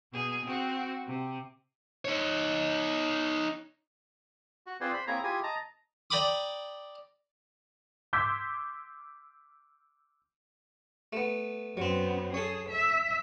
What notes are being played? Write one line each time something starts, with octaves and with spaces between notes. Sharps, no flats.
B2 G#4
C4 F#4
C3
D#4 C#5
F#4
C4 F4 G#4 B4 C5 D5
C5 B5
A#3 C4 E4 G#4 C#5 A#5
E4 F4 G4 G#4 G#5
D#5 A5 A#5
D5 G5 A#5 B5 D6 D#6
C6 D6 E6 G6 G#6 B6
A3 B3
F#2 F#3 B3 C4
G#4 A4 C#5
E5